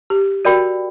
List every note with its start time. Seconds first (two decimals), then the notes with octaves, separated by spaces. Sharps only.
0.10 G4
0.45 F#4 A#4 D5 G5 B5